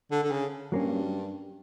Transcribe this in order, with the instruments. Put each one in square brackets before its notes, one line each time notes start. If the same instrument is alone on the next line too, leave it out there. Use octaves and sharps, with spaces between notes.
[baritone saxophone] D3
D3
C#3
[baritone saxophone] G2 [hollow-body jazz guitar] F#3 A#3 C#4